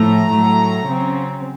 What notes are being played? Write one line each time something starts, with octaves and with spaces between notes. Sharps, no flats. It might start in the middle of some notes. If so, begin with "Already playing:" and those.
Already playing: A2 F3 A3 A#5
A2 F#3 A3
C#3 F#3 C4